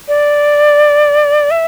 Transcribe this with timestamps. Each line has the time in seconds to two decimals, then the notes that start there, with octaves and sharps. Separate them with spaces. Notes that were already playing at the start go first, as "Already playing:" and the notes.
0.08 D5
1.51 E5